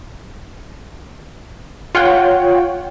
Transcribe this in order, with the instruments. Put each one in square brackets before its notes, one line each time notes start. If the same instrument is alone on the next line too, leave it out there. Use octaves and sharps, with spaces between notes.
[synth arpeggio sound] F4 C#5 F#5 G5